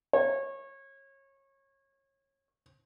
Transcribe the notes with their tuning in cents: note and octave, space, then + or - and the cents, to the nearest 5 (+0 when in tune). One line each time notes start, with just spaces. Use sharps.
C#5 -25